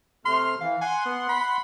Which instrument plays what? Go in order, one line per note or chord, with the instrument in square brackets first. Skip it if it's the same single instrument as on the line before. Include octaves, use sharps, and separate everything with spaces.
[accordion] C3 A3 F6 [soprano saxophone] C6
[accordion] E3 [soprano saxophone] F5
[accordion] F#5 C6 [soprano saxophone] G#5
[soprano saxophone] B3
B5